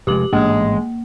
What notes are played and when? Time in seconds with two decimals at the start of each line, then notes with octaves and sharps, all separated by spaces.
0.07 F1 F2 G#3 G4 D6 F#7
0.33 A1 G#2 G#3 A#3